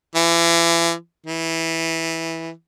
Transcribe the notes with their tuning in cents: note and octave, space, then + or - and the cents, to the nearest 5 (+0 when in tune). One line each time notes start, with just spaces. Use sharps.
E3 +35
E3 -10